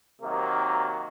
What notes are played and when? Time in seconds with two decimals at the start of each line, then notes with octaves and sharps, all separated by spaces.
0.21 C3 D#3 F#3 A#3